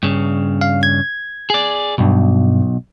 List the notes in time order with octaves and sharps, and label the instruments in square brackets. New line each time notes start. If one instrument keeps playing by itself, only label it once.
[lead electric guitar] G2 C#3
[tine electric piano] F5
G#6
[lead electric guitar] G#4 D5
[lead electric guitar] B1 [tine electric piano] G2 B2